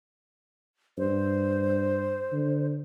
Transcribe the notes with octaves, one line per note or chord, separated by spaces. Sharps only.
G2 C5
D3